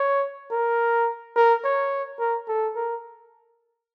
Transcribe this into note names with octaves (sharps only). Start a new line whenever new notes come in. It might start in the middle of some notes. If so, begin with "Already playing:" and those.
Already playing: C#5
A#4
A#4
C#5
A#4
A4
A#4